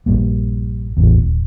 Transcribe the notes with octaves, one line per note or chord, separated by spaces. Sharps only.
A#1 G2 A#3
A1 E2
D#1